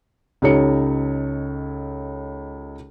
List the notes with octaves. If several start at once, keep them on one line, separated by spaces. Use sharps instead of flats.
C#2 D#4 G4 A4 C#5 C#7